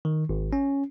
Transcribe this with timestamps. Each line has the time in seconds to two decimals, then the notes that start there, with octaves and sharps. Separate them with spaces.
0.05 D#3
0.29 G#1
0.53 C#4